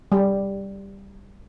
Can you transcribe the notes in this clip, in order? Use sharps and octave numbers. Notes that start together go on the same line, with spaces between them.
G3